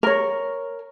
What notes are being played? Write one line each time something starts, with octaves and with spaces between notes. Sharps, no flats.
A#4 C#5